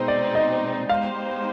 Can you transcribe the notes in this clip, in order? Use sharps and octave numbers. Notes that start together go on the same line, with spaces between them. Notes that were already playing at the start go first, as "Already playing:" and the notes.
Already playing: B2 G#3 C4 D#4 C5
D5
D#5
G#3 B3 D#4 G4 C5 F5